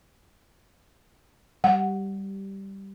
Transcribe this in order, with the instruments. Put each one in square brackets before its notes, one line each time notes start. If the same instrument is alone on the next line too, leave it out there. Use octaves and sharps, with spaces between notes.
[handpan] G3 [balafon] F#5